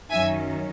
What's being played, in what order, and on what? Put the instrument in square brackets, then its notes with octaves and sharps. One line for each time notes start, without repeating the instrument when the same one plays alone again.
[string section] F#2 D#3 F#3 C#4 E5 G#5